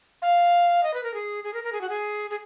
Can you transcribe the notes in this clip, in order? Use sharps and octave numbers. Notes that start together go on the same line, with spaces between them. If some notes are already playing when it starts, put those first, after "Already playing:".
F5
D#5
B4
A#4
G#4
G#4
A#4
A#4
G#4
F#4
G#4
G#4